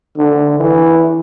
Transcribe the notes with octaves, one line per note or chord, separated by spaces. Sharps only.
D3
E3